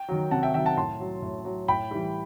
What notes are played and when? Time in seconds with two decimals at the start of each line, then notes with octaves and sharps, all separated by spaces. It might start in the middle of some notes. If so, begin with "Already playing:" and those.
Already playing: G5
0.08 D#3 F#3
0.31 C3 F#5 A5
0.43 E5 G5
0.54 D#3 F#3 E5 G5
0.65 F#5 A5
0.77 A2 A5 C6
1.00 F#3
1.22 A2
1.45 F#3
1.68 A2 G5 B5
1.91 E3 G3